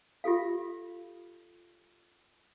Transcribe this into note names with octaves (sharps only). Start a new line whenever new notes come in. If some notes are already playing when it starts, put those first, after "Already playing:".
F4 G4 A4 F5